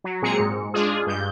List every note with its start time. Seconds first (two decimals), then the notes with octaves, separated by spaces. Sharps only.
0.04 F#3
0.22 A#2 G#3 C4 G#4 A#5 C#7
0.39 G#2
0.74 G#3 D4 F4 G#4
1.07 G2 G6